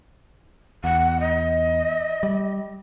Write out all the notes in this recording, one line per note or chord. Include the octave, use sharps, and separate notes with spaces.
E2 F#5
D#5
G3